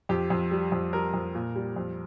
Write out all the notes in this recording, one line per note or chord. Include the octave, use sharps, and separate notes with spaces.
F2 G4
F2
G3
F2
G3 A#4
F2
A#2
G3
F2